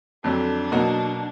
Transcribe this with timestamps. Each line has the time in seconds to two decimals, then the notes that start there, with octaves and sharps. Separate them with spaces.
0.24 F2 D3 F#3 D4
0.72 B2 F#3 A#3 D#4 F#4